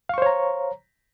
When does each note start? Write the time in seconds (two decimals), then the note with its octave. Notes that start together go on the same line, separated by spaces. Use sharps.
0.09 F5
0.14 C#6
0.18 C5
0.22 C#5
0.26 A#5